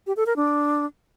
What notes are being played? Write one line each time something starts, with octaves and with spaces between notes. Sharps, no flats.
G4
A4
A#4
D4